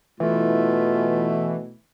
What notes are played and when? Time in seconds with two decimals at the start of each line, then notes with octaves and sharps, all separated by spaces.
0.20 B2 E3 A3 F4